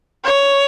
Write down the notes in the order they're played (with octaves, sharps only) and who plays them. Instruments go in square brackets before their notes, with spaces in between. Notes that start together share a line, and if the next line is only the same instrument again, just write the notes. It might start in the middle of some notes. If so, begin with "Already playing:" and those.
[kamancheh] C#5